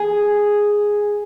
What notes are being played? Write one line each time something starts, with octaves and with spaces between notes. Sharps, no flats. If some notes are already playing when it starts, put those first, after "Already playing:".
Already playing: G#4